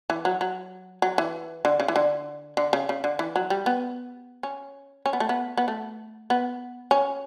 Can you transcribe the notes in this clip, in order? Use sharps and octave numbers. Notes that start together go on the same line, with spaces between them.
E3
F#3
F#3
F#3
E3
D3
C#3
E3
D3
D3
C#3
C#3
D3
E3
F#3
G3
B3
C#4
C#4
B3
A3
B3
B3
A3
B3
C#4